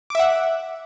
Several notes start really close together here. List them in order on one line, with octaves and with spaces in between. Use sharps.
D6 E5 F#5